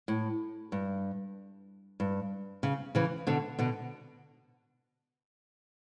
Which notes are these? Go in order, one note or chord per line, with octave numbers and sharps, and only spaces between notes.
A2
G2
G2
C#3
C#3 E3
B2 D3
B2 D3